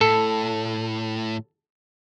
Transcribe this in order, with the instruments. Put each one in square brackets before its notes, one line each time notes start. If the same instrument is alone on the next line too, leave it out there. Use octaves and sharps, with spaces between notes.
[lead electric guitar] A2 [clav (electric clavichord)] A4